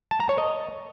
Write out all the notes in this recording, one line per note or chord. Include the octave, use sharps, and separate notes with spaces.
A5
A#5
C#5
D#5